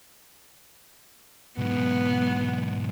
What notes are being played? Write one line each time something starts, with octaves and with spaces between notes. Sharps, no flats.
B1 G#2 B3